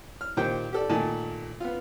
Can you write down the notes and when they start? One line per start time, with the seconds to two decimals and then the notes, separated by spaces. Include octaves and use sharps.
0.21 F6
0.37 A#2 D#3 G4 C5 G5
0.73 G4 A4 D5
0.89 A#2 D#3 A3 G#5 A5
1.60 B3 F4